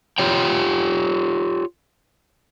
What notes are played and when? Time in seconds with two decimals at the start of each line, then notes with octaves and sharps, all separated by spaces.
0.18 F4 G4 C#5 G5